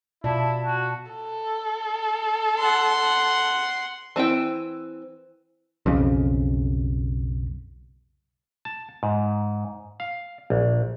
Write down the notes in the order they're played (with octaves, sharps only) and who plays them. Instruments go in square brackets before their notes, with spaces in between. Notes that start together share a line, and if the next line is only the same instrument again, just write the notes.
[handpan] B2 F4 D5 [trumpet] E4 [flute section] A5
[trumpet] F#4
[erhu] A4
[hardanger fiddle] F#5 C6
[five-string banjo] E3 C4 E4 G5
[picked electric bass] B1 F2 C#3
[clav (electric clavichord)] A5
G#2
F5
A#1